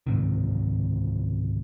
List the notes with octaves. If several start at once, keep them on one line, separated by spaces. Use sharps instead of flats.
C#2 G#2 C3 D#3